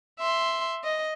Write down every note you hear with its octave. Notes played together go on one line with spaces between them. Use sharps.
E5 C6
D#5